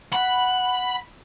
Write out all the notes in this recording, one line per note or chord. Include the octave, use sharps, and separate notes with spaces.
F#5 B5